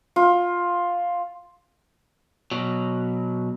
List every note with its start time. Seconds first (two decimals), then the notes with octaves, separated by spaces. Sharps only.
0.16 F4
2.51 B2 F#3